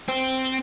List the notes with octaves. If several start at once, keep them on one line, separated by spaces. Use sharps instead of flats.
C4